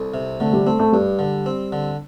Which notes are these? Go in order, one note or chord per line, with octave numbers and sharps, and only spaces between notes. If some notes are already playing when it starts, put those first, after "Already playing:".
Already playing: C2 A4
C3
D3 A3
G3
A3 C4
A3
G2 G3
D3
C4
D3